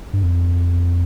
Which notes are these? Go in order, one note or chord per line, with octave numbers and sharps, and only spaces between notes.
G2
F2